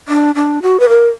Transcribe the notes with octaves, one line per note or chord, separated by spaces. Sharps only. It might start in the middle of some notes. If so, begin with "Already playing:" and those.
D4
D4
F#4
B4
A#4